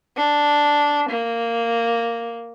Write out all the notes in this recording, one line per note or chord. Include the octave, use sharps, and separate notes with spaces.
D4
A#3